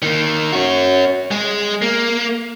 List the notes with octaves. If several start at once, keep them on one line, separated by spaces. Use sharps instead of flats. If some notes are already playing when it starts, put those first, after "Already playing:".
D#3 A#3
C#4 F#4
G#3 G#4
A#3